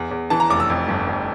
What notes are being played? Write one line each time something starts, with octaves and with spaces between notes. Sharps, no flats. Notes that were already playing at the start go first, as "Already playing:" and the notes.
Already playing: E2
E2
E3 A5
A#5
F1 D6
E6
F2
G1
G1